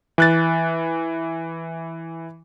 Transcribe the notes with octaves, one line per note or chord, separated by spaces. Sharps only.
E3 F#6 A6